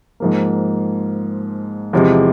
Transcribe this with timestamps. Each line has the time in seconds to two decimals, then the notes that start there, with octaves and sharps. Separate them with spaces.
0.20 G#2 F3 A#3
1.93 E2 C3 F3 G#3